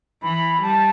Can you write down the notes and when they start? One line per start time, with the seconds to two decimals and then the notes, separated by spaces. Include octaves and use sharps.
0.23 E3 B5
0.62 G3 A5